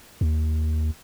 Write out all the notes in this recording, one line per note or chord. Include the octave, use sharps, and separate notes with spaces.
D#2